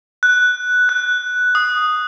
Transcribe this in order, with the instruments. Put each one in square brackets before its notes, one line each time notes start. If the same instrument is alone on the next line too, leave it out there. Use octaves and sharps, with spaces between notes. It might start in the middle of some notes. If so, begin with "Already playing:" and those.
[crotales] F#6
F#6
D#6